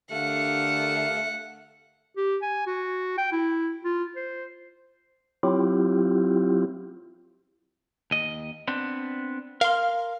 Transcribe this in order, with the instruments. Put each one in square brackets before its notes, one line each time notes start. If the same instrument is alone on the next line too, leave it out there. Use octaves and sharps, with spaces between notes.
[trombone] D3 [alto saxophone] A3 [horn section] G4 A#4 F5 [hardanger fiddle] F#5
[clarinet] G4
G#5
F#4
G5
E4
F4
C5
[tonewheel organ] F#3 C4 E4 F4 G4
[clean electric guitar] D#2 D#5
B3 C4 D4
[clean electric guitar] A#4 C6 [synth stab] F5